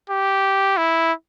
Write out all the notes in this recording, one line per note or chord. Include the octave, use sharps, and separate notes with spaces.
G4
E4